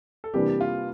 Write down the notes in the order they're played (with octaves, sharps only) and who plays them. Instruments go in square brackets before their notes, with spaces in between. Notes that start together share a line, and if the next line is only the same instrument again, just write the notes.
[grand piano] A4
[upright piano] C3 E3 G3 A#3 D4 [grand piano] G4
[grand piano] F4